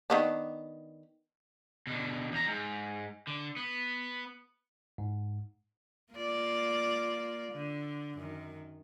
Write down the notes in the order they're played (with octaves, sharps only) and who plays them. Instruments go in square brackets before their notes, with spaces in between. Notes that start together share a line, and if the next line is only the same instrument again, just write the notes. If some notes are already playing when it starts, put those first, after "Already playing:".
[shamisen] D#3 B3 D4
[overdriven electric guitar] B2 D3
E2 A#5
G#2
D3
B3
[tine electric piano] G#2
[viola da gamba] A#3 F4 D5
D3
F#2 D#3